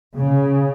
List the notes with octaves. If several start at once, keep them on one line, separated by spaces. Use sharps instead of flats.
C#3